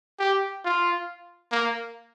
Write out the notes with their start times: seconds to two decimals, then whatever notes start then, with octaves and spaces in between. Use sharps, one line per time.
0.19 G4
0.65 F4
1.52 A#3